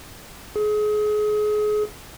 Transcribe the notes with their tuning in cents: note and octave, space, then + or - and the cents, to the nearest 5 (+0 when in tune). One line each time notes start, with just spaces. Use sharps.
G#4 +30